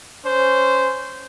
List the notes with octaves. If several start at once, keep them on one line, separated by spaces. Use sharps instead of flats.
C#4 C5